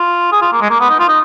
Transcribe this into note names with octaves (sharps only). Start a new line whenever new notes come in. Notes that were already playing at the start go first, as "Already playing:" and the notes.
Already playing: F4
G#4
F4
A#3
G#3
A#3
B3
D#4
F4
D#4